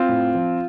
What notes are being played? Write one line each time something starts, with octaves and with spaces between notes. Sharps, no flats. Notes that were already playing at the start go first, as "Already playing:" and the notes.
Already playing: C4 F4
A2
F3